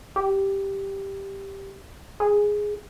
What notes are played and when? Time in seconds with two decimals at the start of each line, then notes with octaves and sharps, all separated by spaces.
0.16 G4
2.20 G#4